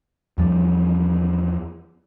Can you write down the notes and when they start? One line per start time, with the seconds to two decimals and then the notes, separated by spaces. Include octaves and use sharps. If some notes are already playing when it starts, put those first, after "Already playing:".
0.38 E2 F3 G3